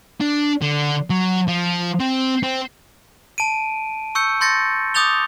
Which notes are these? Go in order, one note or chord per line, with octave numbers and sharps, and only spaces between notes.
D4
D3
F#3
F3
C4
C4
A5 D7 D#7
C#6 E6 G6 C#7
C6 G6 A6 A#6 C#7
D6 D#6 G6 A6 F7 G7